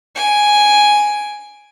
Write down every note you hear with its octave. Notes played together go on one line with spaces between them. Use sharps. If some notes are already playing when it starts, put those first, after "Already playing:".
G#5 D7